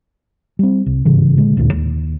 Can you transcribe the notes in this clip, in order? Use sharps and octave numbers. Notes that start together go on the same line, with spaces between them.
G3 C4
C2
G1 G#2 C#3 E3
A#2 D3 G#3
A1 D2 A#2 D3
D#2